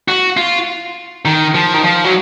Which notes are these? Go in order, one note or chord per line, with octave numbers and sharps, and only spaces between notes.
F#4
F4
D#3
F3
D#3
F3
F#3